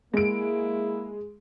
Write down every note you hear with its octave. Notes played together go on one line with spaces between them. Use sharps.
G#3 A#3 E4 D7